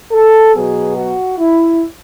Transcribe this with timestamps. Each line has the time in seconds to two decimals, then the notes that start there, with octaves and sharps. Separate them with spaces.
0.12 A4
0.54 B2 F#3 B3 G#4
0.96 F#4
1.38 E4